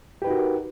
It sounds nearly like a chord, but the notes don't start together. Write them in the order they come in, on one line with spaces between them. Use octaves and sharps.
G4 B4 D#4 F#4 A#4